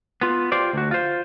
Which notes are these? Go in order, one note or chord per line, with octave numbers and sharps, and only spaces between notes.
B3 F4
F4 G4 C5 D5
D2 F#4
F4 C5